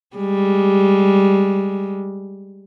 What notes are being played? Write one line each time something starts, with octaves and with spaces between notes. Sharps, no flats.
G3 G#3